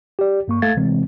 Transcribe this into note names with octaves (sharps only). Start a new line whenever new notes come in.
G4 D5
G2 A#3 C#6
A3 A4 F5 G#6 A6
C3 E3 G#3 C4